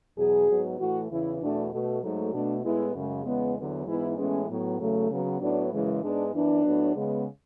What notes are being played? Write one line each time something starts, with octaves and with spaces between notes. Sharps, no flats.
E2 B2 F#3 G#4
G#2 F#3 B3
A2 E3 A3 F#4
E2 C#3 E3 E4
E2 B2 A3 D4
B2 A3
G#2 F#3 A3
B2 A3 D4
A2 G#3 B3 E4
F#2 C#3 G#3
E2 C#3 G#3 B3
E2 D3 F#3 B3
G#2 E3 G#3 B3 E4
A2 E3 G#3 B3 C#4
A2 F#3 B3
E2 C#3 F#3 A3
C#3 F#3 B3
A2 F#3 B3 D4
F#2 C#3 E3 G#3
G#2 G#3 B3 D4
F#2 E3 B3 D4
A2 F#3 B3
C#3 G#3 B3